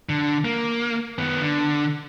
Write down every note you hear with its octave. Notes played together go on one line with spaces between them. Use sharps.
D3
A#3
D#3 B3
D3